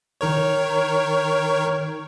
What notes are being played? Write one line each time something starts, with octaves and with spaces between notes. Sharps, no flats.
D#3 A#4 C#5